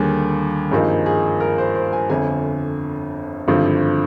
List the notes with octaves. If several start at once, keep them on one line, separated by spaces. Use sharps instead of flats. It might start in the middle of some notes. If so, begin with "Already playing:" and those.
Already playing: D#2 D3 G3 A#3 G#4
G#1 G2 F3 A#3 D#4 G#4
G#4
A#4
C5
C5
G#5
G1 F2 D3 G#5
G#1 G2 D3 F3